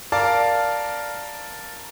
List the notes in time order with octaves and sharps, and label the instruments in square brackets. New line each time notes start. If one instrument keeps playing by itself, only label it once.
[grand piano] A#4 D5 F5 A5